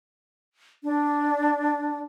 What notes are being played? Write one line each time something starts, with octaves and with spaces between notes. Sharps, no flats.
D4